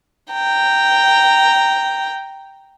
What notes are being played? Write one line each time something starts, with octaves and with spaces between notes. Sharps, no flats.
G5 A#5